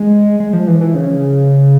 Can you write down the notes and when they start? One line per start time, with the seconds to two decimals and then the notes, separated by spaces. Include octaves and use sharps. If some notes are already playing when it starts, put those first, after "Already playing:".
Already playing: G#3
0.40 G#3
0.53 F3
0.67 E3
0.81 E3
0.94 C#3